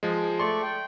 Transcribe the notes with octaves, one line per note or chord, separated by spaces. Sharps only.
F3 G#3
A3 D5 C6 C#6
G5